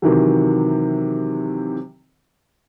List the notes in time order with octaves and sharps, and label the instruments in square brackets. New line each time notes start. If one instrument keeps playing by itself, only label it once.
[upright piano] C3 D#3 E3 F#3